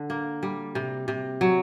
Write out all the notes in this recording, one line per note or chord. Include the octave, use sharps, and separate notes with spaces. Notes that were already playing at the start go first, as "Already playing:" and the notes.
Already playing: D3
A#3
G3
C3
C3
F#3